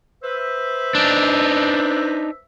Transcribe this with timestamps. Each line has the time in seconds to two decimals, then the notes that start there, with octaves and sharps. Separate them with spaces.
0.24 B4 C5 E5
0.95 D4 D#4